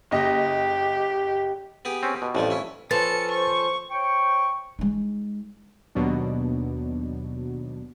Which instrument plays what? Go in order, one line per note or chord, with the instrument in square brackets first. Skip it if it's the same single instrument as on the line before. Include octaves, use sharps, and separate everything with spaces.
[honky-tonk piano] F#1 D#5 [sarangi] G4
[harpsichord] B3 G4 G#4
[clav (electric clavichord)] C4 C#4
B2
[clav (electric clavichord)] A1 F2 [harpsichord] A2 G3 F4
[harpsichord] C#4 E4
[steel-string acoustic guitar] F3 C#4 A4 [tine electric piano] B4 A6 [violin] C#7
[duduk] C5 [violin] C#6
[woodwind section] C5 C#5 G5 C#6
[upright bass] G#3 D#4
[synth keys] D#2 B2 F#3 D4